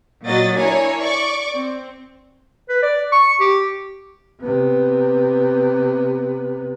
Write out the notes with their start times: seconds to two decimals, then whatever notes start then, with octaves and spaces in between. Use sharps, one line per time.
0.24 A#2 F#3 D#5 A6
0.58 D4 E4 A#4 C#5 G#5
1.01 D5 C#6 D6
1.51 C4
2.69 B4
2.82 D5
3.12 C#6
3.40 G4
4.41 C3 B3